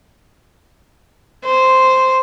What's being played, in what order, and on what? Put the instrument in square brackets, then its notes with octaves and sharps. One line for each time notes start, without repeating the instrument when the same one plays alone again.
[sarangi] C5